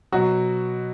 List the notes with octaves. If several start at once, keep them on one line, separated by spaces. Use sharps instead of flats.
B2 F#3 F#4